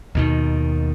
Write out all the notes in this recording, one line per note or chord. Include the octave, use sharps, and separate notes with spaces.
D#2 B2 D#3